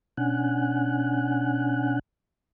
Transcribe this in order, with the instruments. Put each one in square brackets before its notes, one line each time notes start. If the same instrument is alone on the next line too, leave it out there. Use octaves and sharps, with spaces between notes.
[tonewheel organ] B2 C#4 D4 F#5 G#5 F#6